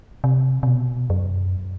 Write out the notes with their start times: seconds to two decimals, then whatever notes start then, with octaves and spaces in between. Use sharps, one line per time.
0.24 C3
0.63 C3
0.67 B2
1.10 F#2